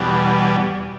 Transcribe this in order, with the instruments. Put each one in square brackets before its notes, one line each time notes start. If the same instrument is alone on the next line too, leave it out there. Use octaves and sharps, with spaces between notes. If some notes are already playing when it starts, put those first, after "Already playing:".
Already playing: [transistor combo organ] E2 B2 G3